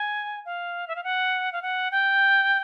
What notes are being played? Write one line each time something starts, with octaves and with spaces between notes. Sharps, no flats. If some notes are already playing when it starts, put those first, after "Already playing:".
Already playing: G#5
F5
E5
F5
F#5
F5
F#5
G5